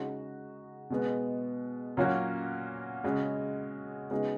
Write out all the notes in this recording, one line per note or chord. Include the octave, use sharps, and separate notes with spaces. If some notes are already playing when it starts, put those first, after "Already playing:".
Already playing: C#3 G#3 D#4 F#4
B2 G#3 B3
A#2 F#3 A#3 C#4 F#4
C#3 G#3 C#4 F#4
C#3 G#3 B3 D#4 F#4